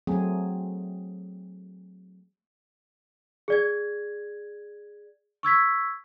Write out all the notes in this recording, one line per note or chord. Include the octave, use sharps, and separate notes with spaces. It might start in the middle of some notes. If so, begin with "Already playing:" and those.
F#3 A3 C4 G#4
G#4 D5 G#6
C#6 E6 G#6 B6